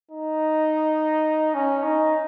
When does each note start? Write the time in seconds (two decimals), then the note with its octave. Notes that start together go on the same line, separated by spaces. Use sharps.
0.11 D#4
1.54 C#4
1.83 D#4